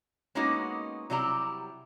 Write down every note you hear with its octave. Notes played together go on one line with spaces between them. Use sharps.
G#3 A#3 B3 C#4 D#4 F#4
C3 F#3 G3 E4 G4 A#5